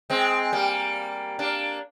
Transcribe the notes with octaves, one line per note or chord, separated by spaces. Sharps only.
G#3 C4
G3 A#3
A#3 D4